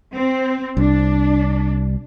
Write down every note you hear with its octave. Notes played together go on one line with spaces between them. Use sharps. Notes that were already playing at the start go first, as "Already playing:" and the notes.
C4
C2 D4